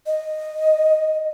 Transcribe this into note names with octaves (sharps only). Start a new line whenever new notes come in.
D#5